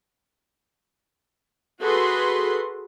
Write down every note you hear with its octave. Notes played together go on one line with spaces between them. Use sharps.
F#4 G#4 A4 B4 C6